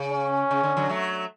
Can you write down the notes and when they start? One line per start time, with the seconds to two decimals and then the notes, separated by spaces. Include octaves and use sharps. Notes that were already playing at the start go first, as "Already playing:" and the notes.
Already playing: C#3
0.12 C#4
0.51 C#3
0.63 D3
0.77 D3 F#3
0.89 F#3 A3